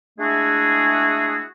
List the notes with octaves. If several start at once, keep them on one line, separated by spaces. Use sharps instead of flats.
G#3 A3 D4 E4 F#4 G#4